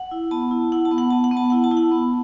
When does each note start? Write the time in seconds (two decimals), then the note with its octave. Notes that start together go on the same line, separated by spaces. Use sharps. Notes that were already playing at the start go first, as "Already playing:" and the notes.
Already playing: F#5
0.11 E4
0.31 B3 A5
0.51 E4
0.72 E4 F#5
0.85 A5
0.91 B3
0.98 F#5
1.11 B3 A5
1.24 F#5
1.31 B3
1.37 A5
1.50 E4 F#5
1.64 A5
1.71 E4
1.77 F#5
1.92 B3